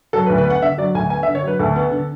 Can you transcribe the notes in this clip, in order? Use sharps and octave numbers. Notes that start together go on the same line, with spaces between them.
F#3 A4
B4
D2
B4
B3 F#5
D3 E5
F#3 D5
D2 G#5
B3 G#5
E5
D3
C#5
F#3 B4
D2 A4
B3
D3